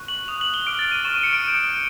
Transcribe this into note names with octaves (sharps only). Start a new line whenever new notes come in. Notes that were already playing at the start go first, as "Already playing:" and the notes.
Already playing: C#6 F#6
F#7
D#6 F#6 F7
F#7
G7
D6 F6 D7
A6
D#7
C#6 F6 E7
D#7
C#7
D7
D#6 G6